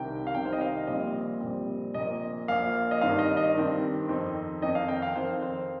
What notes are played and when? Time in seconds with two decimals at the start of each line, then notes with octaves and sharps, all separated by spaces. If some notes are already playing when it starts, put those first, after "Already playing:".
Already playing: C2 C3 D#3 G5
0.27 F5
0.34 C2 C3 D#3 G5
0.45 C5
0.53 D#5
0.61 F5
0.87 A#1 A#2 G3 C4 D#5
1.41 A#1 A#2 G3 C4
1.94 A#1 A#2 A#3 D#5
2.48 A#1 A#2 A#3 F5
2.91 D#5
3.01 G2 D#3 C4 F5
3.19 D#5
3.37 D#5
3.55 G2 D#3 C4
4.08 F2 D#3 C4 D#4
4.62 F2 D#3 C4 D#4 D#5
4.75 F5
4.88 G5
5.02 F5
5.15 F2 D#3 C4 D#4 C5
5.42 C5